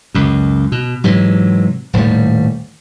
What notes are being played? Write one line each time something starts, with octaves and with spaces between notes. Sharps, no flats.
C#2 F#2
B2
G#2 C3 E3 F#3
D#1 A2 D#3 G3